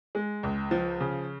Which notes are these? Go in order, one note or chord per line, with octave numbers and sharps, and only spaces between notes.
G#3
C#2
F3
C#3